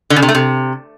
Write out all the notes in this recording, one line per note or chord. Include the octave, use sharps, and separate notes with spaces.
D3
C#3
C3
A3
C3